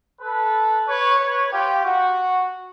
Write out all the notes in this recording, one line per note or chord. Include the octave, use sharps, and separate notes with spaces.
A4 B4
B4 C#5
B4 C#5
F4 G4
F#4